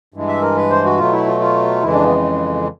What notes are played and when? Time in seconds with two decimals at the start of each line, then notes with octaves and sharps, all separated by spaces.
0.14 G2 E3 G#3
0.28 E5
0.42 A#4
0.56 B4
0.70 C5
0.85 F#4
0.98 B2 F#3 A3 F4
1.13 E4
1.27 F4
1.40 F4
1.83 F2 C#3 E3 G#3 E4
1.93 D4
2.04 B3